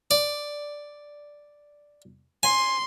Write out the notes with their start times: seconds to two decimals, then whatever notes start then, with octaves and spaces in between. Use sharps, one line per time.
0.11 D5
2.43 G#5 C6